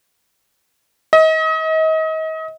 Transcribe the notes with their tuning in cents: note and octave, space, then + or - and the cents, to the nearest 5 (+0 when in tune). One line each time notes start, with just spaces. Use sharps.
D#5 +35